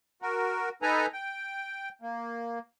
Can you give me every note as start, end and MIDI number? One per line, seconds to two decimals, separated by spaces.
0.22 0.69 66
0.22 0.69 70
0.82 1.06 63
0.82 1.06 69
0.82 1.06 71
0.82 1.06 80
0.82 1.06 82
1.13 1.89 79
2.02 2.59 58